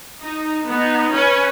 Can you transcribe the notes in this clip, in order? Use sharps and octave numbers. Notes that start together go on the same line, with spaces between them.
D#4
B3 D#4
C#4 B4